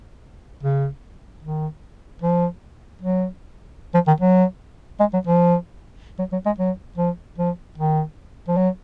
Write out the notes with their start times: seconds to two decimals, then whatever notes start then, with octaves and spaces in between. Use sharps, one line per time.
0.63 C#3
1.43 D#3
2.22 F3
3.02 F#3
3.94 F3
4.07 D#3
4.20 F#3
5.00 G#3
5.13 F#3
5.27 F3
6.18 F#3
6.32 F#3
6.46 G#3
6.59 F#3
6.98 F3
7.38 F3
7.78 D#3
8.48 F3
8.57 F#3